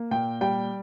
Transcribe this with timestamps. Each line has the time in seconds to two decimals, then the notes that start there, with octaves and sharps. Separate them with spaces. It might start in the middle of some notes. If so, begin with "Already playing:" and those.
Already playing: A#3
0.11 A#2 G5
0.41 G3 G5